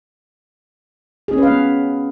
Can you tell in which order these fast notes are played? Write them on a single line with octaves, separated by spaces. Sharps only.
G#4 C#4 B4 F5 B3